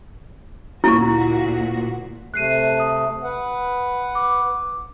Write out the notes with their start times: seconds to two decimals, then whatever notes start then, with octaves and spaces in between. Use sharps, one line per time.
0.84 D2 A#2 A#3 E4 F#4 C#6
2.34 C3 A3 F#6 C7 D#7
2.80 D#6
3.23 B4 F#5
4.15 D6